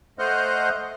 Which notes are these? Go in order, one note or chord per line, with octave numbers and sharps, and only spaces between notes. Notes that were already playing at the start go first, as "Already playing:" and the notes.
A3 C5 D#5 F#5 F6 G6